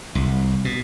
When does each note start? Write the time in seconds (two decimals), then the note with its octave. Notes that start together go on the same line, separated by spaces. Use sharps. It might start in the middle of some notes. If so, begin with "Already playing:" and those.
0.15 C2
0.65 B2